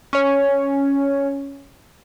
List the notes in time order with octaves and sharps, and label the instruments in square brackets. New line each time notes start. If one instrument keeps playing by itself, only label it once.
[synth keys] C#4 C#5